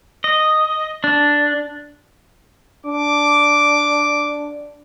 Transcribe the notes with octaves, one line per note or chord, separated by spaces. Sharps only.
D#5
D4
D4 D6